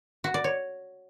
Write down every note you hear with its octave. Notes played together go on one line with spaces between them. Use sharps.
F#4
D5
C#5